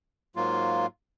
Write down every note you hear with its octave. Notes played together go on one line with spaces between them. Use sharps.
G#2 F#3 A#3 F4